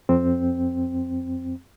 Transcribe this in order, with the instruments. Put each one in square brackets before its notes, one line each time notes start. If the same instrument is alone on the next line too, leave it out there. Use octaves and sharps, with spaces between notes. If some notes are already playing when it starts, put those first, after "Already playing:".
[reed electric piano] F2 C4